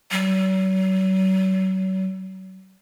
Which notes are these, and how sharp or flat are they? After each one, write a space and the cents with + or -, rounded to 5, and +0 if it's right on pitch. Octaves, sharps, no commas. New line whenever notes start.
F#3 +40